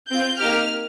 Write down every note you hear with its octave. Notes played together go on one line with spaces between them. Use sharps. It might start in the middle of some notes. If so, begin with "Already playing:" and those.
C4 F4 G6
A#3 D#4 G4 F6